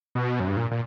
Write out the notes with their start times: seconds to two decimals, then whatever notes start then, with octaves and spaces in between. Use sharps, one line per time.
0.15 B2
0.40 F#2
0.48 G2
0.57 A#2
0.71 A#2